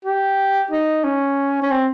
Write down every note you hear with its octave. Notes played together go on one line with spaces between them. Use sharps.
G4
D#4
C#4
C#4
C4